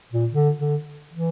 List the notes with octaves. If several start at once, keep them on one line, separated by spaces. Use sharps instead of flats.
A#2
D3
D3
E3